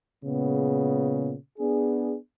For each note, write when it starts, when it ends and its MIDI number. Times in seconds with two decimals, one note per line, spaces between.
0.24 1.34 46
0.24 1.34 49
0.24 1.34 56
0.24 1.34 59
1.59 2.15 59
1.59 2.15 62
1.59 2.15 68